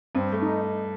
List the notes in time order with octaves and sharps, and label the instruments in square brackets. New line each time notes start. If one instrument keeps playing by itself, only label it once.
[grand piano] G2 [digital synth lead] C4
[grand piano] A3
[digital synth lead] D#4